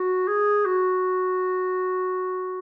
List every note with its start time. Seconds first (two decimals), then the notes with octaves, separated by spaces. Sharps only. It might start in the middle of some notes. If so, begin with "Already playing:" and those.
Already playing: F#4
0.27 G#4
0.66 F#4